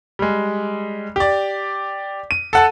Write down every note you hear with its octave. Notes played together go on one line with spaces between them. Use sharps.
G3 G#3
G4 D5
D#7
A4 F#5 A5